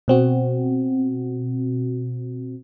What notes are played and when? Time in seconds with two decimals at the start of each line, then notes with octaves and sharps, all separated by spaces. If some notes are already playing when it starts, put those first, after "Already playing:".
0.08 B2 C4 F#4